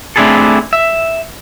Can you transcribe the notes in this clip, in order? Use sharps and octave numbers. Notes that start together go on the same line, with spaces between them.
A3 C4 D4 E4 G#4 A4
E5